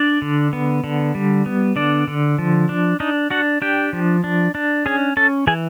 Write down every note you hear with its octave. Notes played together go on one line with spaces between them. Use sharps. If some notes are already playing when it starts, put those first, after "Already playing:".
Already playing: D4 D5
D3
B3
D3
G3
B3
D3 D4 D5
D3
F3
D4
D4 D#4 D#5
D4 F#4 F#5
D4 G4 G5
F3
D4
D4
C#4 G#4 G#5
C#4 A4 A5
E3 G#4 G#5